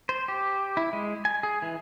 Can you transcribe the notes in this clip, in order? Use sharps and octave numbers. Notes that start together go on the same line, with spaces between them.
C5
G4
E4
G#3
G#5
G#4
E3